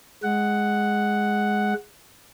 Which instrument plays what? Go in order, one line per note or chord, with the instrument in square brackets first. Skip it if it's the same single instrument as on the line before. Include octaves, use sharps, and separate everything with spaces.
[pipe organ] G#3 F#5